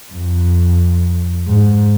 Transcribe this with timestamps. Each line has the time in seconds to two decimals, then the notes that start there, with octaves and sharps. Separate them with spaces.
0.12 F2
1.48 G#2